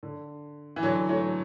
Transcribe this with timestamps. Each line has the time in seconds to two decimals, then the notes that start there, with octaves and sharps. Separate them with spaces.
0.03 D3
0.76 E3
0.83 D3 F#3
1.09 F#3 A3